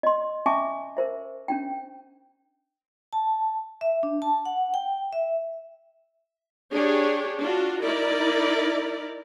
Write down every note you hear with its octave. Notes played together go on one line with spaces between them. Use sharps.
D#5 C6
C#4 E5 G#5 A5 C#6 D6
A#4 C5 E5
C#4 D4 G5
A5
E5
D4
A5
F#5
G5
E5
D4 G4 G#4 C#5
D4 F4 F#4
D#4 E4 A#4 D5